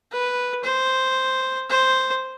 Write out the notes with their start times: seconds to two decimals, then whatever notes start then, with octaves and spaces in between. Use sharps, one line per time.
0.12 B4
0.64 C5
1.70 C5